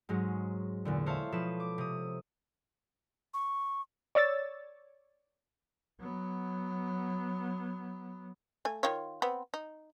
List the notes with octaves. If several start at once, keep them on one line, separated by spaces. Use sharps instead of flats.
G#2 F#3 G#3 C#4
E2 A#2 D3
C5 C#5 E5 F5 A5
B2 F3 A4 B4 E7
D6
C3 D#6
C#6
C#5 D5 E6 A6
F#3 B3
A3 G#5
D#3 F4 C#5
B3 C4
D#4